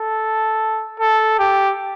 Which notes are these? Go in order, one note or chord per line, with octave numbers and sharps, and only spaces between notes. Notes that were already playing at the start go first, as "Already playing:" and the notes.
Already playing: A4
A4
G4